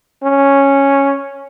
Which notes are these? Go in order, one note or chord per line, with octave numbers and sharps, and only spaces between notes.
C#4